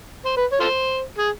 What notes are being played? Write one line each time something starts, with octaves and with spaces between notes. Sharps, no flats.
C5
B4
C#5
F4 A4 C5
G#4